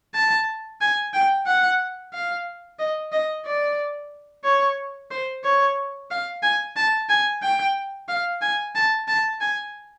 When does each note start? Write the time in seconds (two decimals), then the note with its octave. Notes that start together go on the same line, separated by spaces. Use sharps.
0.14 A5
0.81 G#5
1.14 G5
1.47 F#5
2.14 F5
2.79 D#5
3.12 D#5
3.45 D5
4.44 C#5
5.11 C5
5.44 C#5
6.11 F5
6.43 G#5
6.76 A5
7.09 G#5
7.43 G5
8.09 F5
8.41 G#5
8.75 A5
9.08 A5
9.41 G#5